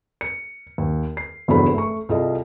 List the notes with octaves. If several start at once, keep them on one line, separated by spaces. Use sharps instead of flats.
C#7
D#2
C7
F#1 E2 G2 F#4 A4 B5
A3 C#6
C2 C3 F4 G#4 A4 D#5